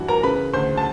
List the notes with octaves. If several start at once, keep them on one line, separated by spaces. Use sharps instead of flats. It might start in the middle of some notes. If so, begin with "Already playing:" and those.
Already playing: G2 E3 F#4
A#4 A#5
C#3 B4 B5
D2 C5 C6
A5